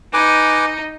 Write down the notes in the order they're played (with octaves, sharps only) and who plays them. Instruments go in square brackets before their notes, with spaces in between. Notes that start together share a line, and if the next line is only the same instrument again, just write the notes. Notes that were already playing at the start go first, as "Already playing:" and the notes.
[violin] D#4 [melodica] B4 G#5 D6